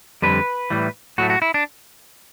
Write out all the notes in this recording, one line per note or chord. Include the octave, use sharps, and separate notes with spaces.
F2 D3 G3 B4
A2 E3 G3
A2 F#3 A3 F#4
F#4
E4
D4